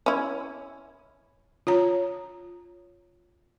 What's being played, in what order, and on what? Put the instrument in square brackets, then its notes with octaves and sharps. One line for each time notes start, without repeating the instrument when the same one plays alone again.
[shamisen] C#4 E4
[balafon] F4 C#5 A#5